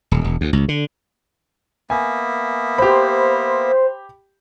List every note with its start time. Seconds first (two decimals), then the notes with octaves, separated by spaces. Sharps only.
0.11 D#1
0.24 E1
0.41 D2
0.53 C#2
0.69 D3
1.90 A#3 B3 E5 G#5
2.78 G4 C5 B5